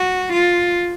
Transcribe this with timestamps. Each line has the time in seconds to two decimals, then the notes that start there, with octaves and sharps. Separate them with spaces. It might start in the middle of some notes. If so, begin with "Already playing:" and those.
Already playing: F#4
0.33 F4